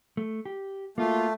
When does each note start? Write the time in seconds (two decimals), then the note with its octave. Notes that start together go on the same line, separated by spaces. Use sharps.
0.17 A3
0.46 G4
0.98 A3 A#3 F4 F#4